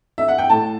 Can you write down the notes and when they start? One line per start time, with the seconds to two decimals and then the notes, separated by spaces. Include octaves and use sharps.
0.18 E5
0.28 F#5
0.38 G5
0.50 A2 A5